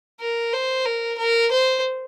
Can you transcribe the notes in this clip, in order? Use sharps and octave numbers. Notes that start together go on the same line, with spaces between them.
A#4
C5
A#4
A#4
C5